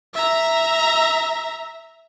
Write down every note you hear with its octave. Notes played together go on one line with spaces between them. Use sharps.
E5 A#5